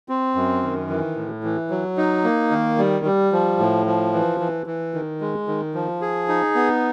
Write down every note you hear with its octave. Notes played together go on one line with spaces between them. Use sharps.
C4
F#2
D#3
E3
A2
E3
F#3
D#4
A#3
D#3
G3
G3
F3
A2
F3
E3
E3
E3
D#3
G#3
D#3
F3
G#4
D#4
B3